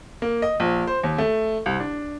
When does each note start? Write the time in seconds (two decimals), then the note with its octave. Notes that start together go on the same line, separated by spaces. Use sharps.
0.22 A#3
0.42 D#5
0.60 A#1
0.87 C5
1.03 D#2
1.18 A3
1.66 C2
1.80 D4